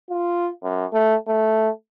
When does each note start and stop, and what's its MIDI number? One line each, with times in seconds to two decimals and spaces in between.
0.10 0.50 65
0.63 0.85 42
0.92 1.15 57
1.28 1.69 57